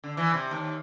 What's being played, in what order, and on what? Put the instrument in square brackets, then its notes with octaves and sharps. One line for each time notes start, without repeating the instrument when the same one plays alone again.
[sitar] D3
E3
C3
D#2